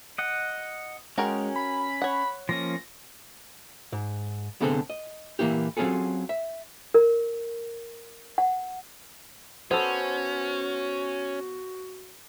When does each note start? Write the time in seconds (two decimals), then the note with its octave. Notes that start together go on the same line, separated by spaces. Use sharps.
0.18 D#5 F#5
1.18 G#3 C#4 F#4 A#4 G5
1.56 B5
2.02 C#5 F#5
2.49 F3 A#3 C#4 A#6
3.92 G#2
4.60 C2 D3 B3 C4 G#4 A4
4.90 D#5
5.39 A#2 E3 A#3 E4 G4
5.77 F#3 C4 C#4 F4 G#4 A4
6.29 E5
6.94 A#4
8.38 F#5
9.71 B3 C#4 F#4 A4 C5